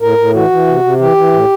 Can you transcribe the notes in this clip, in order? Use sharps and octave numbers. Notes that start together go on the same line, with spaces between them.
A2 A#4
A2
E3 F#4
E3
C3
C3
E3 G4
E3
A2